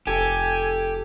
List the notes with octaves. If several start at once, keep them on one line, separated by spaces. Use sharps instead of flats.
F1 G4 A4 G#5